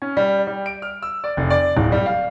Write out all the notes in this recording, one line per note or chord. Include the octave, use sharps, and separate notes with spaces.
C#4
G3
G3
D7
F6
E6
D5
F1
D5
D1
G3
F5